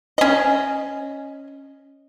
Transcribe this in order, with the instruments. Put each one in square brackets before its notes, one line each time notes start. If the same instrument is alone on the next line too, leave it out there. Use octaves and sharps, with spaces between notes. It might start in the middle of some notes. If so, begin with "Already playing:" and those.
[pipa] C#4 D#5